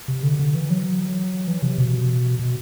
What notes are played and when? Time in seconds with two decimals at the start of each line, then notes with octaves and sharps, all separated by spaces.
0.08 C3
0.23 D3
0.39 D3
0.55 E3
0.70 F#3
1.48 E3
1.62 C3
1.78 B2
2.39 B2